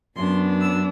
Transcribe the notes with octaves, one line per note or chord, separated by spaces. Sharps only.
F#2 F#3 B3 D4 C6
E6